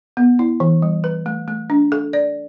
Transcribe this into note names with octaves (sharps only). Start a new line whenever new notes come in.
B3
E4
E3
G3
B4
A3
A3
D4
A4
D5